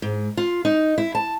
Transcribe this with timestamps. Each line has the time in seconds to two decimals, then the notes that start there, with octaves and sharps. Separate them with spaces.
0.02 G#2
0.37 F4
0.65 D#4
0.98 E4
1.15 A5